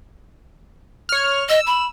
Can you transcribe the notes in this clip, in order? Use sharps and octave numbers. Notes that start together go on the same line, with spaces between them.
C#5 F6
D#5 E6
B5